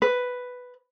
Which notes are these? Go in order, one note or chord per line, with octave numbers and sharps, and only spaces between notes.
B4